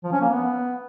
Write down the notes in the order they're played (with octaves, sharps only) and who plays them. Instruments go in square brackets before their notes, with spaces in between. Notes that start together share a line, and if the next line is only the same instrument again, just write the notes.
[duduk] F3
C#4
A#3
B3